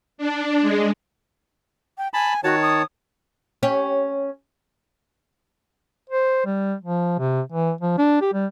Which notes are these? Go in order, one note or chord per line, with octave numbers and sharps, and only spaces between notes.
D4
G#3
G5
G#5 A5 B5
D#3 F#4 C#5 A5
D#6
C#4 G4 C#5
C5
G3
F3
C3
E3
F3
D4
G4
G3